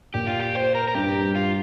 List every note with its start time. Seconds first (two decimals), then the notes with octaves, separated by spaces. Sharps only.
0.14 A#2 G4
0.27 F4
0.40 G4
0.55 C5
0.75 A#4
0.88 A#4
0.95 G2 G4
1.35 F4